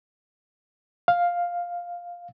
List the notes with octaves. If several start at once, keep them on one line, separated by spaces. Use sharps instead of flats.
F5